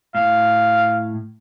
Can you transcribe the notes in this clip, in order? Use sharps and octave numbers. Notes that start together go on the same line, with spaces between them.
A2 F5